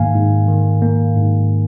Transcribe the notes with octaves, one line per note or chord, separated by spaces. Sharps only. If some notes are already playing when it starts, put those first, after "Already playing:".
Already playing: G#2 D#3 A#3 F5 G#5
G#2
D#3
A#3
G#2